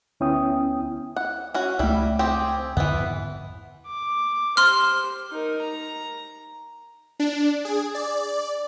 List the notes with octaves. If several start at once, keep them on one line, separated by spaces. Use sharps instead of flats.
D2 B3 C#4 E4 G5 D#6
F#5
C#4 F#4
C#2 G3 A3 E4
C4 G4 G#4
F2 G#2 D3 E3 B3
D6
G4 C5 C6 F6
D#4 A#4
A#5
D4
G#4
D5